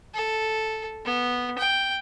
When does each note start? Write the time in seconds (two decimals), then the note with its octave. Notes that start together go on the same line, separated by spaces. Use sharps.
0.14 A4
1.05 B3
1.58 G5